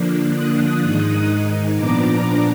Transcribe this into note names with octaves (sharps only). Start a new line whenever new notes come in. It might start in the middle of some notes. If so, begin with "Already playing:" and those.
Already playing: D3 F3 A#3 D4
D#6 F#6
G#2 D#3 G#3 D#4
A#2 F3 B3 D4 A#5 D6